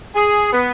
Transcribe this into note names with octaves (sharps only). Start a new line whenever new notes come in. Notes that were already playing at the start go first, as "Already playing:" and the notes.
G#4
B3